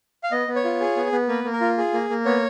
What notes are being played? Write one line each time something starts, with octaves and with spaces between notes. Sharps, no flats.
F5
B3 D#5
B3
C#5
F4
G#4
B3
B3
A#3 B4
A#3
A#4
F4
G#4
A#3
A#3
B3 C#5